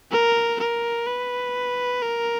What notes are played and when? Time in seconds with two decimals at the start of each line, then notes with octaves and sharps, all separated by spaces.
0.11 A#4
0.60 A#4
1.07 B4
2.02 A#4